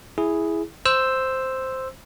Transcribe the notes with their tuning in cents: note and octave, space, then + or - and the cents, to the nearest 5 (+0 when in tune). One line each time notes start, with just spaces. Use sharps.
E4 +0 G#4 +0
C5 +0 E6 +0